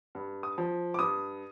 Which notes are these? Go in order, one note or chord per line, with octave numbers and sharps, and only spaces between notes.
G2
D#6
F3
D6
G2 D#6